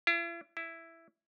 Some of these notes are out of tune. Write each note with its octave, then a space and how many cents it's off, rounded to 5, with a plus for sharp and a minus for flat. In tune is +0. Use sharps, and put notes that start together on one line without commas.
E4 +45
E4 +5